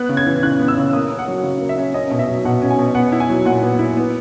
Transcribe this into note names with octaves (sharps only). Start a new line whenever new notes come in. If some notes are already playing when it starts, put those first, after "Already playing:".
Already playing: B3 F#6
C#3
G#6
E3
C#3 F#6
B3
E6
C#3
A#3 D#6
C#4
F#5
F#3
C#3
A#3
E5
C#4
C#4 D#5
B2
E5
F#3
B2 F#5
C#4
G#5
B2
B3 F#5
E4
G#5
F#3
A#2 F#5
B3
E4
B3